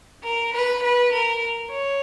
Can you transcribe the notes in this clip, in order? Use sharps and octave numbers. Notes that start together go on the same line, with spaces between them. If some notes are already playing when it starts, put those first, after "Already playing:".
A#4
B4
B4
A#4
C#5